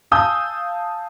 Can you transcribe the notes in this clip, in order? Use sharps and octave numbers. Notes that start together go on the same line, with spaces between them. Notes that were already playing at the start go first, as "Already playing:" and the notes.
F5 G#5 A5 D#6 E6 G6